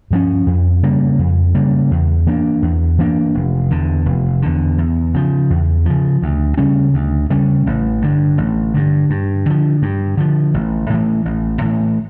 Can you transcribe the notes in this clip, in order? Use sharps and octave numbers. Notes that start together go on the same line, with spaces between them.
G2 F3 C#4
F2
C#3 G3 A#3
F2
C#3 G3 A#3
E2
E3 A#3 D4
E2
E3 A#3 D4
F1
E2 D3
F1
E2 D3
E2
C#3 F3
E2
C#3 F3
D2
C#3 G3 C#4
D2
C#3 G3 C#4
A1
G2 D3
A1
G2 D3
G2
D3 F3
G2
D3 F3
A1
A2 E3
A1
A2 E3